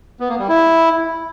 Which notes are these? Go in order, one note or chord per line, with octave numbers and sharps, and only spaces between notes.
B3
A#3
G3
E4